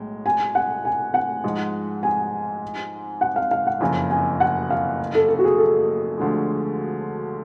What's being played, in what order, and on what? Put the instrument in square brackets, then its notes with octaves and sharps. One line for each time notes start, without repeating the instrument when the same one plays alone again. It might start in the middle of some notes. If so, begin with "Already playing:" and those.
Already playing: [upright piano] B1 A2 G#3
[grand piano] G#5
F#5
G#5
F#5
[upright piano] G#2 F3 G#3
[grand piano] G#5
F#5
F5
F5
F#5
[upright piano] F#1 F2 C#3 F3 [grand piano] G#5
[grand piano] G#5
F#5
F5
A4
A4
F#4
G#4
A4
[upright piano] D2 D3 F3 G#3